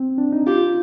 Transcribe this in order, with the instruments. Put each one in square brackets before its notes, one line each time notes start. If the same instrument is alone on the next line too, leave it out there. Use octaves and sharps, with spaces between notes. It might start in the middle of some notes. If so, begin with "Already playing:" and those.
Already playing: [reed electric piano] C4
D4
D#4
[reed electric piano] F4 [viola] G4